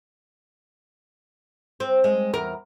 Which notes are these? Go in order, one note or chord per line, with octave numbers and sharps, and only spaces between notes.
C4
G#3
E2 A#4